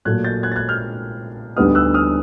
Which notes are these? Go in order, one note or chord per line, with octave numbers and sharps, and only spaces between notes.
A#2 F#3 A3 F#6 G#6
G6 A6
F#6 G#6
A6
F#6 G#6
F6 G6
D2 D3 G3 B3 D#4 D#6 F6
E6 F#6
D#6 F6